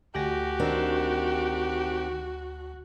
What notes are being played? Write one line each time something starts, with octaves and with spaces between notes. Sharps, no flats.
D2 F#4 G4 G#5 A#6
D#3 C4 D4